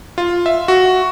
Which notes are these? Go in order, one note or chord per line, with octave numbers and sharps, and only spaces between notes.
F4
E5
F#4